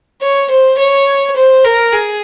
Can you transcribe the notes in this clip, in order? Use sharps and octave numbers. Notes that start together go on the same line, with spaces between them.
C#5
C5
C#5
C5
A#4
G#4